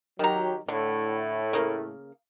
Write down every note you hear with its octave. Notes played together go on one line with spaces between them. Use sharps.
D#3 F#3 G4 A#5
A2 D3 A3
C#3 A#3